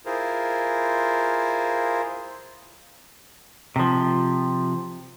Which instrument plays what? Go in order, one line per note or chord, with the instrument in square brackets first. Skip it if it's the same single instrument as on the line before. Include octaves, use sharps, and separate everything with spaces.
[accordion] E4 F4 G#4 A#4 C5
[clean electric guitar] C3 F3